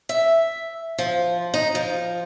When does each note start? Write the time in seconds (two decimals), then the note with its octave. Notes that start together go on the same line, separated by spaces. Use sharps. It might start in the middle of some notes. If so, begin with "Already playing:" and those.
0.09 E5
0.98 F3
1.54 D#4
1.75 F3